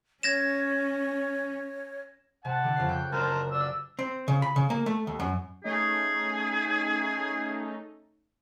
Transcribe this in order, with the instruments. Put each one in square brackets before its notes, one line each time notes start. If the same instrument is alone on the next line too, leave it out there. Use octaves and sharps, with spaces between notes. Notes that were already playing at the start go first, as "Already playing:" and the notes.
[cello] C#4 [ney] C#5 [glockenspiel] G#6 A#6 E7
[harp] C3 [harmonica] F#5 A5
[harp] D3 A4
F2 C#3 C7
G5 F#6 G6
[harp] F#1 [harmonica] A#4 C5 A5
[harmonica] D5 E6
[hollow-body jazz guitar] C4
C#3
B5
C#3
A#3
A3
D#2
F#2
[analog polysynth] A3 C#4 D#4 [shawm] G#4